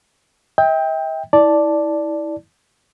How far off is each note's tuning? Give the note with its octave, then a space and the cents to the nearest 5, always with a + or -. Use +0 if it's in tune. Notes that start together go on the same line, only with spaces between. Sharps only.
E5 -45 G5 +15
E4 -30 D5 +0 A5 +0